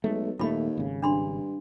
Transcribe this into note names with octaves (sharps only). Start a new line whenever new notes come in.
B1 G#3 A3
D#1 D#2 A3 F4 B5
G#1 C#3
G2 D4 B5 C6